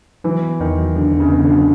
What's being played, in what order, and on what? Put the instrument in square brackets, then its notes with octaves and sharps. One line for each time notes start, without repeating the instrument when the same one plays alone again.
[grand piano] E3 [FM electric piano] F#3
[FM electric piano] B3
[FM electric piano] E2 [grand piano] D#3
[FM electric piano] F#3
[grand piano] D3 [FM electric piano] F#3
[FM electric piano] E2
[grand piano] C#3
[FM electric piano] B3
[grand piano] D3
[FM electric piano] F#3